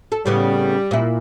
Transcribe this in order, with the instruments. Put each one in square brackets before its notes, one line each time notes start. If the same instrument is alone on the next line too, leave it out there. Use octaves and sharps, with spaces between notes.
[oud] A4
[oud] A2 C#3 B3 [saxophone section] G3
[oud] A#2 E4